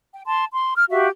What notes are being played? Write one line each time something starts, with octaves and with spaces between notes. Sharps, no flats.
G5
A5 C6
C6
F6
F#4 G4 E5 F5